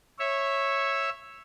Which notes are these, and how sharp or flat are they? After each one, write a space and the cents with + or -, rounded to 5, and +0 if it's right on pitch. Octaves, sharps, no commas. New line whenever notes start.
C#5 -10 E5 +0